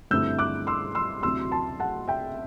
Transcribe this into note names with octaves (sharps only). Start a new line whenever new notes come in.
G2 D3 A3 C4 E4 E6 G6
D6 F#6
C6 E6
C6 E6
D2 C3 F#3 C4 E4 C6 E6
A5 C6
F#5 A5
E5 G5